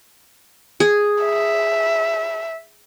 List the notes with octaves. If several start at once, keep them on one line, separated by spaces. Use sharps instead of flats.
G#4
E5